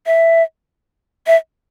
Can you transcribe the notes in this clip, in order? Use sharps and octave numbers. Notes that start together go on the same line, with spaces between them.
E5
E5